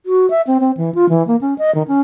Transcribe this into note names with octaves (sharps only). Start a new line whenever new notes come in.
F#4
E5
C4
C4
E3
F4
E3
A#3
C#4
D#5
D#3
C#4